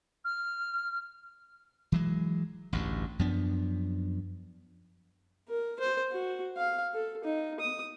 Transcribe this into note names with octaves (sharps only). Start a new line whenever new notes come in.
F6
E3 F#3 G#3
A1 D2 G2
F#2 F3 B3 D4
A#4
C5
F#4
F5
A4
D#4
D#6